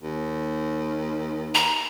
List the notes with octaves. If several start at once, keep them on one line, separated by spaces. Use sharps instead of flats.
D#2
A#5